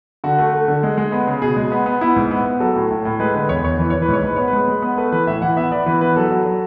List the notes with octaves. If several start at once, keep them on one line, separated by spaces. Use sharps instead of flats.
D3 F#4
A3
A3
D3
G#3
G#3
B3
C#3
B2 G#4
G#3
B3
B3
B3 E4
G#2
B3
B3
F#3 A4
A2
A2
A2
G#3 B4
D3 B4
E2 C#5
E2 C#5
E3 B4
E3 C#5
B4
G#2
C#5
G#2 B4
B3 C#5
B4
G#3
G#3
B3
A3 B4
E3 B4
A2 E5
E3 F#5
B3 E5
B3 D5
E3 B4
B3 B4
F#3 A4
F#3
F#3